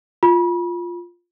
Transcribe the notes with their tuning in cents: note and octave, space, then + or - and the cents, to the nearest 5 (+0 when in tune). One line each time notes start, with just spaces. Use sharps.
F4 +0 B5 -35